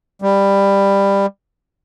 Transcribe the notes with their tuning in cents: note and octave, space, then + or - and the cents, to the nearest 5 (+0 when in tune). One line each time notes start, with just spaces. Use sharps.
G3 +15